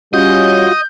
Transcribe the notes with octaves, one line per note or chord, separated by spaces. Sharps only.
G3 C#4 F4 F#4 D#5 G6